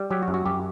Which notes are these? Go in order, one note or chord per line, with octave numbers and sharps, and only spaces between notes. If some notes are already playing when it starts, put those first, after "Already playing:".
Already playing: G3
F#3 G4
F#4
F#2
F#4
F#2 G4